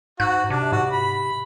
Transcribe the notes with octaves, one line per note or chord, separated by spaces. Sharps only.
G#2 F#4 F#6
C3 D4
G#2 F#4
B5